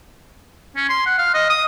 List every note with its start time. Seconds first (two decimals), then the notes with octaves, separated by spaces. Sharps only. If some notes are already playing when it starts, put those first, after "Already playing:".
0.76 C#4
0.90 C6
1.06 F#5
1.19 F5
1.34 D#5
1.50 D#6